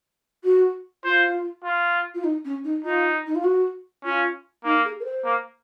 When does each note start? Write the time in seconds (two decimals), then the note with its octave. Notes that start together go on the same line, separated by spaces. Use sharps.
0.44 F#4
1.04 F4 C5
1.64 F4
2.15 F4
2.24 D#4
2.45 C#4
2.64 D#4
2.85 D#4 F4
3.27 D#4
3.35 F4
3.44 F#4
4.04 C#4 F4
4.64 A#3 D#4
4.85 G#4
5.00 A#4
5.05 C5
5.25 A#3